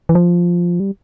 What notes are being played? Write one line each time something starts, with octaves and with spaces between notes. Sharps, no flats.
E3
F3
G3